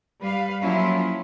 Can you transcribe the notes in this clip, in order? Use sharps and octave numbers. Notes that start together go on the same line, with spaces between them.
G3 B4 F5
F3 F#3 A#3 C#4 E4 F4